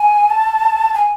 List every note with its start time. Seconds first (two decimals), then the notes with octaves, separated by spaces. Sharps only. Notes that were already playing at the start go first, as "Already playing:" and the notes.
Already playing: G#5
0.30 A5
0.94 G#5